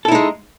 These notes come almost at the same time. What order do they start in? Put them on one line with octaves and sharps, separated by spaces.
A4 E4 D#4 G#3